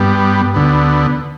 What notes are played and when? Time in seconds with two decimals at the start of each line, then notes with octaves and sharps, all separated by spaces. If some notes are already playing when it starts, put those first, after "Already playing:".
Already playing: G2 G3 B3
0.54 D2 D3 B3